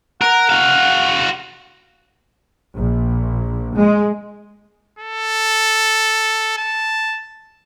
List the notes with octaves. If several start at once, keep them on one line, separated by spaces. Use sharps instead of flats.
A#4 F#5
F#4 F5
A#1
G#3
A4
A5